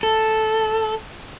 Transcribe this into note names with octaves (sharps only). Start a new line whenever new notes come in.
A4